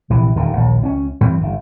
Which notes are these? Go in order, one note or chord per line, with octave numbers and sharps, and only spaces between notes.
A#1 C3 E3
D#1 D2 D#3
A#1 D#2
C#2 C4 C#4
F#2 E3 C4
G1 D#3